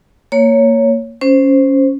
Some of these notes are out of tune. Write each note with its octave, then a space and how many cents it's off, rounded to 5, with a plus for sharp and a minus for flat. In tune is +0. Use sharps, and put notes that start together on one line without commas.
A#3 -15 C#5 +5
C#4 +0 C5 +0